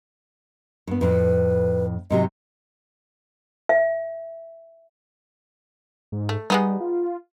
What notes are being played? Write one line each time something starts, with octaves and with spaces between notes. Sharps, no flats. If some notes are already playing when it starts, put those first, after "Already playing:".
G2 B3
F2 A2 B4
G#2 C3 F#3 D#5
E5
G#2
A3
G3 G#3 B3 D#4
F4